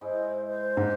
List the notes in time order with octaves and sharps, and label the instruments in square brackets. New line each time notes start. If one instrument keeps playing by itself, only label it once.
[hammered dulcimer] G#2 G#3 E4 [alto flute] C5
[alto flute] C5
[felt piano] G#2 [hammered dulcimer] A#3 D#4 G4